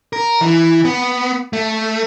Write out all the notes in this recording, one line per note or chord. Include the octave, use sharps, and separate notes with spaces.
A#4
E3
B3
A3